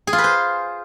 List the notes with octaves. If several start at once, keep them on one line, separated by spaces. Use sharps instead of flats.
G#4
F4
B4
C5